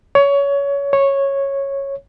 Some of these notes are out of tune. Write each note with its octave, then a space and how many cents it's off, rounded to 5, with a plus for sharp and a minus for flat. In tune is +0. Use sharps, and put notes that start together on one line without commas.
C#5 +20
C#5 -10